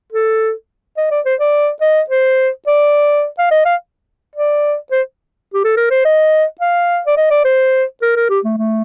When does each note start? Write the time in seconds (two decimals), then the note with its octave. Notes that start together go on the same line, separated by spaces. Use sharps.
0.12 A4
0.98 D#5
1.11 D5
1.25 C5
1.40 D5
1.81 D#5
2.10 C5
2.67 D5
3.39 F5
3.51 D#5
3.65 F5
4.35 D5
4.92 C5
5.54 G4
5.64 A4
5.77 A#4
5.91 C5
6.05 D#5
6.60 F5
7.06 D5
7.17 D#5
7.31 D5
7.45 C5
8.02 A#4
8.16 A#4
8.29 G4
8.44 A3
8.58 A3